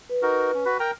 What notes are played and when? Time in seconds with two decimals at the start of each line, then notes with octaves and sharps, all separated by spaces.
0.09 B4
0.22 D#4 F#4 A#4
0.54 C#4
0.66 F#4 B4 B5
0.80 A#4 G5 A#5